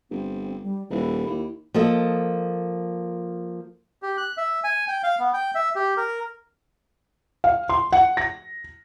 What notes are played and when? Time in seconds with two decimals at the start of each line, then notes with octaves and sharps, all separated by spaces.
0.10 G1 C4
0.63 G3
0.90 D#1 E4
1.27 D#2
1.74 F3 A#3 A4 D#5
4.02 G4
4.17 F#6
4.37 E5
4.64 G#5
4.88 G5
5.03 F5
5.19 B3
5.33 G5
5.55 E5
5.76 G4
5.97 A#4
7.44 F5
7.69 C6
7.93 F#5
8.17 A#6